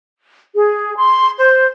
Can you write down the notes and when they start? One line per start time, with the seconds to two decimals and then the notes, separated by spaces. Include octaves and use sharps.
0.54 G#4
0.97 C6
1.37 C5